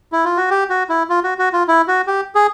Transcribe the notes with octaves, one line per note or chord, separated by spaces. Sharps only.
E4
F4
F#4
G4
F#4
E4
F4
F#4
F#4
F4
E4
F#4
G4
G#4